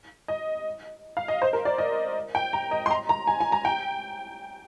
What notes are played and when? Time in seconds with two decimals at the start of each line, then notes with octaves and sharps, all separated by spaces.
0.28 D#5
1.17 F5
1.28 D#5
1.42 C5
1.53 A#4
1.65 D5
1.78 D#5
2.35 G5
2.53 A#5
2.71 D#5
2.86 C6
2.91 A#5
3.09 A#5
3.27 G#5
3.40 G#5
3.52 A#5
3.65 G5